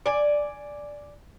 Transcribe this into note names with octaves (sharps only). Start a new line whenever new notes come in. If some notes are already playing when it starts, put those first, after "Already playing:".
D5 G#5